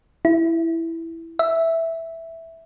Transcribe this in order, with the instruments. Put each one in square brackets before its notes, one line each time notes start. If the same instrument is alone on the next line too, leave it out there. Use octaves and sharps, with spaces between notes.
[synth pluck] E4
E5